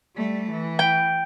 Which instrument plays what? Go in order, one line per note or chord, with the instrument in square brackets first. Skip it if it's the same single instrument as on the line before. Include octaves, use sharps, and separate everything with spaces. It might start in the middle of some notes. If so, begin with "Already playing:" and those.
[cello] G3 A3
E3
[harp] G5